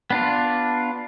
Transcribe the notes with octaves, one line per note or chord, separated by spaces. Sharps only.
B3 D4 F4